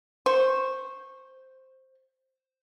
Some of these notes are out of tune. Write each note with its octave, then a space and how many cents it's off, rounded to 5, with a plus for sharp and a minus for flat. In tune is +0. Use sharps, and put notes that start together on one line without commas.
C5 +0 C#6 -20